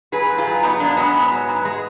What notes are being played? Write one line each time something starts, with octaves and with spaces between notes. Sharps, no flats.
F#3 G#4 B4
G#2
F4 G#4
F#3
F#3 B3 D#4
G#2 A#3 D4
F#3 G#3 B3
G#2
F#3
G#2
G#3